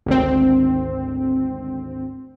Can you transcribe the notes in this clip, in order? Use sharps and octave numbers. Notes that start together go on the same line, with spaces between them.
G#1 D2 C4